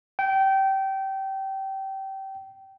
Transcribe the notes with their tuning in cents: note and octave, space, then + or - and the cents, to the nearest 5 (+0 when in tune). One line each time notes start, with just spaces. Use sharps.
G5 -20